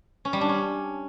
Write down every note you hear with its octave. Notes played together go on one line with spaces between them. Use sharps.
C#4
G3
D4
C#4